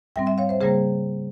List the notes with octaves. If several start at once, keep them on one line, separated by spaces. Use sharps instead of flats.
G#2 G3 C4 E5 G5
E5 G5
C#5 F5
C5 E5
C#3 G3 A#3 G#4 C5